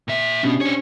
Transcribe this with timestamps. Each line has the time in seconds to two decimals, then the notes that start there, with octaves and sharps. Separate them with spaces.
0.08 A#2 E5
0.43 B2 C#4 D4 G4
0.61 C4 C#5